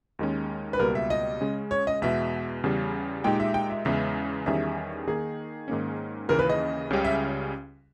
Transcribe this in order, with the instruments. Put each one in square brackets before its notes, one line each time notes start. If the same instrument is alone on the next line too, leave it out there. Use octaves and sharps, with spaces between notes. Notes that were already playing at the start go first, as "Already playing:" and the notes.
[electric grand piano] D#2 D#3 G#3 C#4
[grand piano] B4
[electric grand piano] C#2 B2 G3 A#3 [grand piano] A#4
[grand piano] E5
D#5
[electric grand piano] C#3 G#3 C#4
[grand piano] C#5
D#5
[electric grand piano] E2 B2 G#3 [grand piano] E5
[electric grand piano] E2 C#3 G3
[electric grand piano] A#2 G#3 D#4 G4 [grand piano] G5
[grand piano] E5
G5
E5
[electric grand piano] E2 C#3 E3 G#3 [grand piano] E5
[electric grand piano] E2 D#3 G3 C#4 G#4 [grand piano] E5
[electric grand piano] D#3 A#3 D#4 [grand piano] G#4
[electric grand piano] G#2 D#3 A#3 C#4
[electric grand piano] D#2 C#3 E3 A#3 [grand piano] A#4
[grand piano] B4
D#5
[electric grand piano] C#2 C#3 G3 C#4 G4
[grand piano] E5